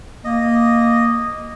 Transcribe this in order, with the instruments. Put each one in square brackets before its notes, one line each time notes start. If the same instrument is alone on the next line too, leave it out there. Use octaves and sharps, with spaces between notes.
[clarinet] A#3 [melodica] D#5